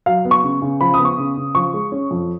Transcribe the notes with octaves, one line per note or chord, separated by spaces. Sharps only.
F#3 F5
B3
C#6
C#3
C#3
F3 B5
D#6
B3
C#6
C#3
C#3
F3 C#6
G#3
C#4
F2